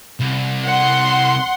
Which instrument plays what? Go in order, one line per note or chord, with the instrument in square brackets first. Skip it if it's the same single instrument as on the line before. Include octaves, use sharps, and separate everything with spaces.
[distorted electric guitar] C2
[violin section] F#5 C6